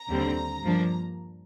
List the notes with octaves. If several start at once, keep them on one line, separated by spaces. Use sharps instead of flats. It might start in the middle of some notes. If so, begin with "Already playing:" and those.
Already playing: A#5
D#2 D3 G3 C4
G2 F3 A#3 D4